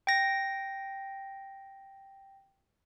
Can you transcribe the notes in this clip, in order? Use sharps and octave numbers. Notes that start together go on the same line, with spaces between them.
G5 A#6